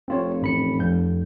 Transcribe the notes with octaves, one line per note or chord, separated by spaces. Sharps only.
F1 C4 F4 C#5
A1 B5 C#7
F2 G6